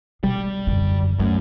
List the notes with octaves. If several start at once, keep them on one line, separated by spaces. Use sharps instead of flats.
B2 G3
F#2 D3
F#2 A3